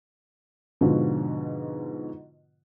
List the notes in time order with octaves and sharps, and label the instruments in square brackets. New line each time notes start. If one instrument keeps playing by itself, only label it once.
[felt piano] G#2 B2 D3 F3 F4 F#4